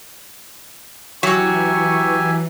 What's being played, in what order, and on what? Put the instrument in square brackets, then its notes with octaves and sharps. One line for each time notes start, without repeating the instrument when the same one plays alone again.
[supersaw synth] E3 [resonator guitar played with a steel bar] F#3 [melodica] G4 E5 G#5 [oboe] C#6